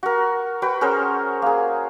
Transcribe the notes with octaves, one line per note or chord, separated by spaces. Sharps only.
F#4 A#4
F#4 B4 G5
C#4 G#4 A#4 C5
A#3 G#4